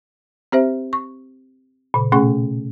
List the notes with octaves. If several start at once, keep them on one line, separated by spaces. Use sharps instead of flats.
C4 G4 C5 E5
C#6
A#2 C#3
B2 A3 C#4 G#4 F#5 C#6